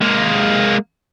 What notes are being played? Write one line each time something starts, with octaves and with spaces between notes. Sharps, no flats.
G#3 A#3